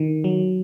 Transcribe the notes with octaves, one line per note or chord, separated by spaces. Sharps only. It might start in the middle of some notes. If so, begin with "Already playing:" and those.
Already playing: D#3
F#3